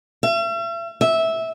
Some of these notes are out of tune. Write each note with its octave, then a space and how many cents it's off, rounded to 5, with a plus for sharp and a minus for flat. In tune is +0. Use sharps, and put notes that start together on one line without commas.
E5 +40
E5 -15